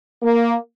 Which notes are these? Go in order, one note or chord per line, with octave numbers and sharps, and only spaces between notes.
A#3